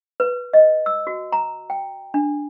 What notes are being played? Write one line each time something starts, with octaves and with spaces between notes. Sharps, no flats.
B4
D#5
E6
F#4
A#5
G5
D4